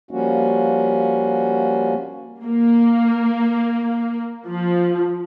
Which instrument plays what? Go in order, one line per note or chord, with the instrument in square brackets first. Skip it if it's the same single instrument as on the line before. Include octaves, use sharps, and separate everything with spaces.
[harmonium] F3 G3 A#3 C#4 F#4
[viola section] A#3
F3